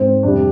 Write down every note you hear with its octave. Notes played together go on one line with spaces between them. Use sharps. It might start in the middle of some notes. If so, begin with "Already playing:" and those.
Already playing: G#2 C4
F2 C3 G3 D4